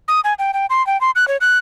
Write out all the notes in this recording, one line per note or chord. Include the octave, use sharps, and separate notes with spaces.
D#6
G#5
G5
G5
C6
G5
C6
F#6
C#5
F#6